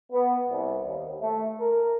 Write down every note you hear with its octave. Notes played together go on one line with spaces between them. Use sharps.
B3
C2
D#2
A3
A#4